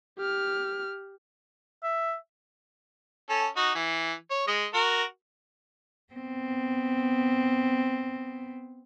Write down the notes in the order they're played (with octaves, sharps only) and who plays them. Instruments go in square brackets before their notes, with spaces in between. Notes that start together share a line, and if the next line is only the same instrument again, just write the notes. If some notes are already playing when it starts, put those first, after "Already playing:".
[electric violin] G4 F6
[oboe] E5
[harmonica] C#4 A4
D#4 F#4
E3
C#5
G#3 D#5
F#4 A#4
[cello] B3 C4